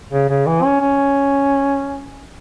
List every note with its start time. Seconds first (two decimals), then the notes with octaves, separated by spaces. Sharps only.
0.12 C#3
0.29 C#3
0.46 E3
0.63 C#4
0.81 C#4